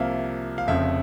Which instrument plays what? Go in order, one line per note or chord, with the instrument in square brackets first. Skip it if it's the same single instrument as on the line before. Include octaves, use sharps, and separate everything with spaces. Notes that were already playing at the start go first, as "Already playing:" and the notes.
Already playing: [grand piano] C2 C3 F3 A#3 E5 F5
F5
F1 F2 C#3 E5